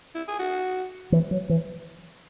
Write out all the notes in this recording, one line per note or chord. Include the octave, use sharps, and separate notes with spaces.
E4
G#4
F#4
E3
F#3
E3